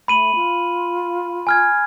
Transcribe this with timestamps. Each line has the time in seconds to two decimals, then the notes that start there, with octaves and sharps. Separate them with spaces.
0.08 A3 B5 D#7 F#7
0.35 F4
1.47 G#5 F6 G#6